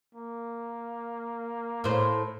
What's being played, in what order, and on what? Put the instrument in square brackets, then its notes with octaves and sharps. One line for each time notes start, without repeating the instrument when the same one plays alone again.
[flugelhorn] A#3
[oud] A2 C5